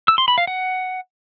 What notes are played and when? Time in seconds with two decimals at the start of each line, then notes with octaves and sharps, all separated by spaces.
0.08 E6
0.18 C6
0.28 B5
0.38 F5
0.47 F#5